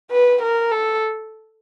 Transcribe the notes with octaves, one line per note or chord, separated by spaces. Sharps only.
B4
A#4
A4